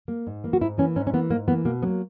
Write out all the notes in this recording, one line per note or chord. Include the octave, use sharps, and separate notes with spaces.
A#3
G#2
E3 A#3
F#4
G#2 E4
E3 A#3 C#4
G#2 C#4
C#4
E3 A#3 B3
G#2 A#3
E3 A#3 B3
B2 A#3
F#3 A#3 B3